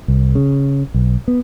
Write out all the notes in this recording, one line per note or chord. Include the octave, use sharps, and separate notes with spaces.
C2
C#3
B1
B3